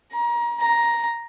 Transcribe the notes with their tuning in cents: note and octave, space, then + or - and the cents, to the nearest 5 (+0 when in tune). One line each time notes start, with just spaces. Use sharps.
A#5 +30
A#5 +5